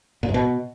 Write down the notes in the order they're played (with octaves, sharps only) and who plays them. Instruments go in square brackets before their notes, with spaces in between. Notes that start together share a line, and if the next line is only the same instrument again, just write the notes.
[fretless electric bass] A#2
G#2
B2